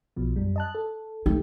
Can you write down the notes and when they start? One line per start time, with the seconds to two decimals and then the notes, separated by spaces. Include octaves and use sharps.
0.16 B1 B2 F3
0.36 F#2 G3
0.56 D#5 A5 F#6
0.75 A4
1.26 A3 D#4 G4